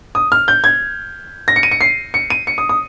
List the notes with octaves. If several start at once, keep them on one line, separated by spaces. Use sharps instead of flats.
D#6
F6
G6
G#6
A#6
C#7
D#7
C#7
C7
C#7
D#7
C#7
D#6
D#6